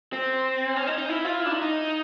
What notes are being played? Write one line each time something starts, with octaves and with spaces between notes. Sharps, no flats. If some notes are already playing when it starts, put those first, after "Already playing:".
C4
C#4
D#4
D#4
E4
F4
E4
D4
D#4
D#4